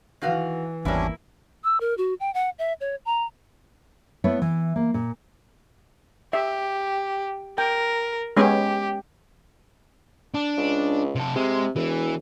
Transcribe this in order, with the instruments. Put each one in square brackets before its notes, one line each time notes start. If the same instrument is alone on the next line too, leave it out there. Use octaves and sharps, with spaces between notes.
[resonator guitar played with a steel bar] D#3 F#4 F5 [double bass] E3
[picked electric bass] G#1 E2 [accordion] G3 C#4 D4 [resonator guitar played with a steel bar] A#3 E4
[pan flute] E6
A#4
F#4
G5
F#5
E5
C#5
A#5
[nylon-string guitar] A3 B3 E4 B4 C#5
E3
A#3
A#2
[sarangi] G4 [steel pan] E5
[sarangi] A#4 [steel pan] G5
[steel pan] G#3 B3 C#4 [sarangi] G4
[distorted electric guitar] D4
[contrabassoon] C#2
[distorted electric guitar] C3 A4
[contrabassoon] C3 [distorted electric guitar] G#3
[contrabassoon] E1 [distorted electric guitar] E3